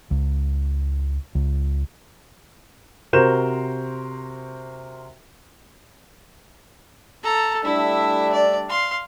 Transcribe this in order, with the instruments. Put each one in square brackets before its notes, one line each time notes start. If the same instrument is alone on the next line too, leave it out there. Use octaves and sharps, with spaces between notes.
[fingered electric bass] C#2
C#2
[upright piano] C3 F#4 A#4 C5 G6 E7
[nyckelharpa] A4 A5 [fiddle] A#5
[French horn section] G3 A3 D4 [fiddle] E4 [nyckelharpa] E5
[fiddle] D5
[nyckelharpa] F5 [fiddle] C6